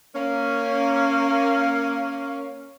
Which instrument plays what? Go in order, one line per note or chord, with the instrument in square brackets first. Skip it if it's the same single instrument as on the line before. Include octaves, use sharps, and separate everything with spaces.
[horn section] A#3 C#4